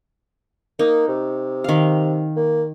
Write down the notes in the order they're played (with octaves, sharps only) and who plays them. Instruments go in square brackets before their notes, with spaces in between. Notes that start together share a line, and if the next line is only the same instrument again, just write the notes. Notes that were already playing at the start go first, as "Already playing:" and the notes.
[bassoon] A#3 [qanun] D#4
[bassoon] C3
[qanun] D#3 F5
[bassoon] A#3